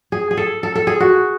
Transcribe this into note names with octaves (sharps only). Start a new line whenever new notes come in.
G#4
G#4
A4
A4
A4
G#4
F#4